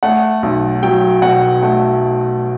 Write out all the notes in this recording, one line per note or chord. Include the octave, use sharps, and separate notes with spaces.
A3 F#5
B1
F#3 G5
B2 F#5
A3 F#5